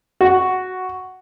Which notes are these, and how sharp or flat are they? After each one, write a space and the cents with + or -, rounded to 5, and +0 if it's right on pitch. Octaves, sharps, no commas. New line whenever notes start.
F#4 +0